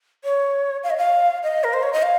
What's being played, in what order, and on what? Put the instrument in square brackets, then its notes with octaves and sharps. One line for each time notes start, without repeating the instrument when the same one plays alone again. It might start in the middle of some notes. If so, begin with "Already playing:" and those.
[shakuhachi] C#5
F5
D#5
F5
D#5
A#4
C5
C#5
D#5
F5